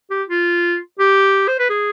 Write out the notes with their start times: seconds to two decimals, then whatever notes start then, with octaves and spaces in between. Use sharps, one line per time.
0.11 G4
0.28 F4
0.99 G4
1.48 C5
1.59 B4
1.70 G#4